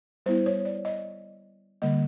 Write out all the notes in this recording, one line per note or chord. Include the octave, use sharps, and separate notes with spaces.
G3 B3 E4 C5
C#5
D5
D#5
D3 G3 A#3 D#5